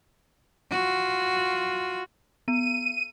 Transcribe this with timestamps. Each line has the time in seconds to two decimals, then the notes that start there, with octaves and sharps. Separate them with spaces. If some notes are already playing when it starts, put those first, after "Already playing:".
0.71 F4 F#4
2.48 B3 D#7